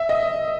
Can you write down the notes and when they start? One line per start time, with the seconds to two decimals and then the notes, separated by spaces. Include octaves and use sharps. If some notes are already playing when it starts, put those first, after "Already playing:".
Already playing: E5
0.09 D#5